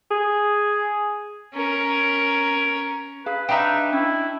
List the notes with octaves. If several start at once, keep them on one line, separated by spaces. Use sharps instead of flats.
G#4
C#4 A#4
G#4 B4 F5
D4 D#4 B4 E5 G5 A#5
C#4 E4 G5